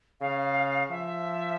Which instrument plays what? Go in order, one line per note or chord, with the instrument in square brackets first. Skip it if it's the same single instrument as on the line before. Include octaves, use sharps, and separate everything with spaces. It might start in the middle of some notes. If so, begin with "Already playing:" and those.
[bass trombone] C#3 [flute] F5
[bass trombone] F3 [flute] E5